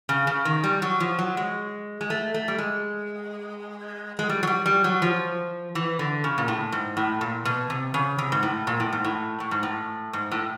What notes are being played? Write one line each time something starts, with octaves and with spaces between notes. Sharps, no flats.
C#3
C#3
D#3
G3
F#3
F3
F#3
G#3
G#3
A3
A3
G3
G#3
G#3
G3
F#3
G3
G3
F#3
F3
E3
D3
C#3
A#2
A2
G#2
A2
A#2
B2
C3
C#3
C3
G#2
A2
A#2
A2
G#2
A2
A2
G#2
A2
G#2
A2